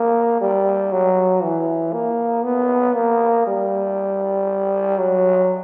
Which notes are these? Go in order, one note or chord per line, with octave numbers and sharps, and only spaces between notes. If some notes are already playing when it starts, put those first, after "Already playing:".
Already playing: A#3
G3
F#3
E3
A#3
B3
A#3
G3
F#3